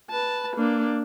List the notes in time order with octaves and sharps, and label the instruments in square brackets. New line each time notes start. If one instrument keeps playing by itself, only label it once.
[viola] B4 A5
A#3 D4